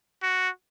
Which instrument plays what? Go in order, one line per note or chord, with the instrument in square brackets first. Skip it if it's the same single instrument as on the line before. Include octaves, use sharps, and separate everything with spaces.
[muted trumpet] F#4